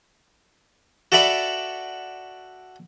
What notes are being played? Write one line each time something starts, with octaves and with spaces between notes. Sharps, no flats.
F#4 A4 D5 E5 B5 C#6